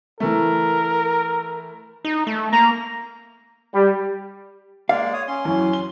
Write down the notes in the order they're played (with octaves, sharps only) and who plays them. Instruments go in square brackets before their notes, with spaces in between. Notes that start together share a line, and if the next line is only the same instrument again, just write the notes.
[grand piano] E3 A3 [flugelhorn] A#4
[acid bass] D#4
A3
[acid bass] A#3 [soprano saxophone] A#5
[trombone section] G3
[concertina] G#3 A#3 D5 [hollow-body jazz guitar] F5
[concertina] C#5 D#6
C#4 C6
[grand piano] F#2 E3
G7